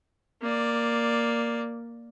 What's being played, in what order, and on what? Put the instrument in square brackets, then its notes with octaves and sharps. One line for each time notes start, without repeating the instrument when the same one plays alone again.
[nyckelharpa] A#3 D5